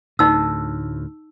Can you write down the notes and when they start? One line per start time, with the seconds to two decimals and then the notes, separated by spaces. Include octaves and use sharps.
0.19 D2 A2 D#4 E6